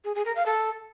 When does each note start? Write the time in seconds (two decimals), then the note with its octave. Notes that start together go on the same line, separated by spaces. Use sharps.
0.05 G#4
0.15 G#4
0.25 A#4
0.36 F5
0.46 A4